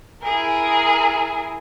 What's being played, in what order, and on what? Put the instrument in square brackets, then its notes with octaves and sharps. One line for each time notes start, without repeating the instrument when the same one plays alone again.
[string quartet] E4 G#4 A#4